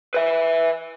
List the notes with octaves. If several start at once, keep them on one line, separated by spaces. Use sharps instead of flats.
B4 E5